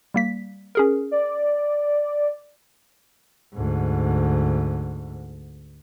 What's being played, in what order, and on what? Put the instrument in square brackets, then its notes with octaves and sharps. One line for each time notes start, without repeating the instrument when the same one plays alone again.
[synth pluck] G3 A#3 B6
C#4 G#4 A#4
[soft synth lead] D5
[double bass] D2 G#2